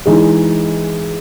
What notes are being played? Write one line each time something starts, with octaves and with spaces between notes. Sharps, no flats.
E3 G#3 D#4 G#4